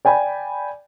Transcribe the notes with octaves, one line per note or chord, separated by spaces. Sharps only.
D5 G5 G#5 B5